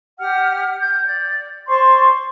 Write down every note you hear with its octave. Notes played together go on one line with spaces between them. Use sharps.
G4 F#5 F6
G6
D5
C5 D5 C6 C#6